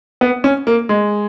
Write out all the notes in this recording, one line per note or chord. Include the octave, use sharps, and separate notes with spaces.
B3
C#4
A#3
G#3